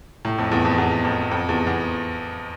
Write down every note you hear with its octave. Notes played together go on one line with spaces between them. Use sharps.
A2
F2
E2
F2
E2
F2
F2
E2
E2